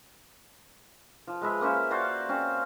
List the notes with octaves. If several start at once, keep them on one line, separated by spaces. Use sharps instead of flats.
F3
G#3 B4 E5
A#3 C#4 C5 E5
F#4 C5 D5 F5
C4 C#4 C5